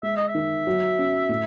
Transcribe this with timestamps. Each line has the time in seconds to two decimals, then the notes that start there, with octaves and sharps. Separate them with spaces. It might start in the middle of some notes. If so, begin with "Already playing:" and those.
0.03 G#3 E5
0.17 D#5
0.28 E5
0.35 D#3
0.67 F#3
0.99 C#4
1.29 A2